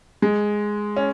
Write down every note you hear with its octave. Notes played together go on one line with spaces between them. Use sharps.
G#3
C#4